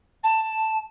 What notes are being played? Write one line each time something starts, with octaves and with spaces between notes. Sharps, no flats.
A5